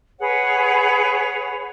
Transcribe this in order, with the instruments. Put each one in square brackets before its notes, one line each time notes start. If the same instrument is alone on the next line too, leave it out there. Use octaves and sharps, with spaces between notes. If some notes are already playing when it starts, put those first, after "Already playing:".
[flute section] G#4 B4 C#5 F#5